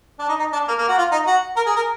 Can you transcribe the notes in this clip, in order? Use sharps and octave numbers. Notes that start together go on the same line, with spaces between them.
D4
D#4
D#4
D4
A#3
A#3
F#4
F4
D#4
F#4
A#4
G#4
A#4